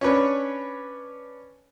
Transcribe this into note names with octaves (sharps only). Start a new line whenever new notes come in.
C#4 D4 B4 C#5